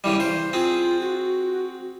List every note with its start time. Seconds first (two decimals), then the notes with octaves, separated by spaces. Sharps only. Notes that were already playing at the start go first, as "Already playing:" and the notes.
0.04 C#3 E3 G3
0.20 C5
0.53 C4 F4 G#4
1.00 F#4